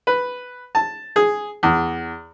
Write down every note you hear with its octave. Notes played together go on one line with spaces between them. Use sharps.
B4
A5
G#4
E2